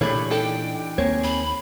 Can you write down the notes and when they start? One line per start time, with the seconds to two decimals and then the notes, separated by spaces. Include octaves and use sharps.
0.01 A#2 E3 A3 D4 G4 G#4 C#5 B5
0.31 D#4 A4 G5
0.98 D#2 A#3 C4 G#4 C#5
1.24 B5